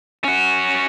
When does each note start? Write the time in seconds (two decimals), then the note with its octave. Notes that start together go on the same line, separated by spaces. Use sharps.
0.24 C#4 F#4